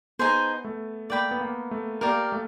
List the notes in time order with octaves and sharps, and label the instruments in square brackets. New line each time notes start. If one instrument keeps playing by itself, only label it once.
[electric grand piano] B3 [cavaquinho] D#4 G#4 C5
[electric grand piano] A3
[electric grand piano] A#3 [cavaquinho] D5 G5 B5
[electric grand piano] B3
A#3
A3
[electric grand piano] A#3 [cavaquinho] G4 A#4 D5 F5
[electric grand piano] A3